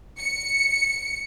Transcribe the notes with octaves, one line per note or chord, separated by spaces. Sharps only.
C#7